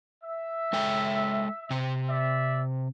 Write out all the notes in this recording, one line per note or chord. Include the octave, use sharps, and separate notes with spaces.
E5
G#3 A4 G5
C3 C4
D5 E5